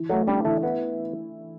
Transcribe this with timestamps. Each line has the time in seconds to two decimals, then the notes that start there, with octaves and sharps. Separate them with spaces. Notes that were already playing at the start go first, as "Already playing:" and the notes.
Already playing: E3
0.09 F#3 A3
0.27 G3 D4
0.45 E3 A3
0.63 B3 E4